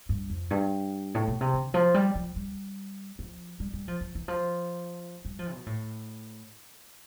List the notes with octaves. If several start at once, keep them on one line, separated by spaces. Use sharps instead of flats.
G2
F2
G2
A2
B2
C3
D3
F3
G3
F3
G3
F3
G3
G3
F3
F3
E3
F3
G3
F3
B2
A2